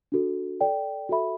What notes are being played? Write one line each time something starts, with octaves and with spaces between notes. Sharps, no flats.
D4 F#4 A4
A4 D5 G5
F#4 A4 E5 B5